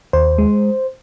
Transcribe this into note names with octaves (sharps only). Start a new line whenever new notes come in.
D#2 C5
G#3